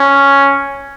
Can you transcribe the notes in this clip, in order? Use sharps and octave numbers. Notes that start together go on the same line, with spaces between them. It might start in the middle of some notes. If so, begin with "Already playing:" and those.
Already playing: C#4